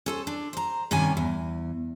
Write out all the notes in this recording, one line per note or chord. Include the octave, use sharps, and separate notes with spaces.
C#4 A4 C5
D4
C5 A#5
G2 C3 D#3 C#4 G#5
E2